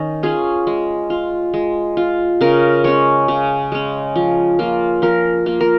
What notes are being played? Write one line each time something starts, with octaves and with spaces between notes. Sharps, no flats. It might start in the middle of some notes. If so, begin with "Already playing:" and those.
Already playing: D#3 C#4 D#5
C#4 F4 G#4
G#3
F4
G#3
F4
C#3 A#4
G#3 C#4 C#5
C#3
G#3 C#4
F3
A#3 F4
F3 A#4
A#3 F4
A#4